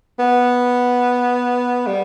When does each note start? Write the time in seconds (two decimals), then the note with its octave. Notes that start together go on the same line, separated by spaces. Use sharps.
0.19 B3
1.87 G3